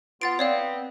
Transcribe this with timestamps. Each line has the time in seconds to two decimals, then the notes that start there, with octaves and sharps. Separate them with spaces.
0.21 B3 F4 F#5 A6 D7
0.39 B3 C4 C#5 D5 F5